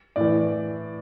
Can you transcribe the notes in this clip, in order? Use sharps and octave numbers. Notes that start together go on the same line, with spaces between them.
A2 E3 D5